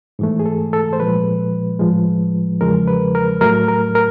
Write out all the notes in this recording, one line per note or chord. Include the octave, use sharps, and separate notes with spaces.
G#2 E3 A3
G#4
A4
A4
C5
A#2 F3 G#3 B4
A2 F3 G#3
E2 C#3 F3 G#3 A#4
B4
A#4
A2 F#3 A3 A#4
A#4
A#4